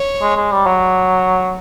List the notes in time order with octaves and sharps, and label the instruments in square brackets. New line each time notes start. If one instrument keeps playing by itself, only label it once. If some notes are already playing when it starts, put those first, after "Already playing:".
Already playing: [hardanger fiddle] C#5
[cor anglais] G#3
G#3
G3
F#3